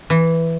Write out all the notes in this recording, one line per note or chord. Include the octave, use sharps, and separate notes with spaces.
E3